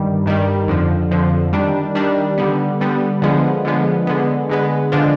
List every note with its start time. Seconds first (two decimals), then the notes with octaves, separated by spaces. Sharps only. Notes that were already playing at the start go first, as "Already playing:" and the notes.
Already playing: G2 D#3 G3
0.26 G2 D#3 G3
0.68 F2 D3 F3
1.11 F2 D3 F3
1.53 D#3 G3 D4
1.95 D#3 G3 D4
2.38 D3 G3 B3
2.81 D3 G3 B3
3.22 D3 F3 G#3 B3
3.65 D3 F3 G#3 B3
4.07 D3 G#3 B3
4.50 D3 G#3 B3
4.92 D3 F3 G#3 D4 F4